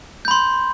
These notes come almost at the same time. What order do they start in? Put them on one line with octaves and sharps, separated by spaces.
G6 B5 C6